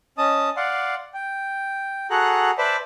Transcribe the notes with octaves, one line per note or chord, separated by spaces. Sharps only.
C#4 D#5 A5 D#6
D5 F5 F#5 C6
G5
F#4 G#4 A4 F#5 A#5 F#6
B4 C5 D5 E5 A5 B5